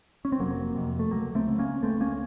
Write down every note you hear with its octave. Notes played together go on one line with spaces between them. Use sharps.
C#4
C4
F1 F#3 A#3
F2 C3
A3
C#2 F#3 A#3
A3 C4
C#3
A#3 C#4
C#2 A3 C4
A#3 C#4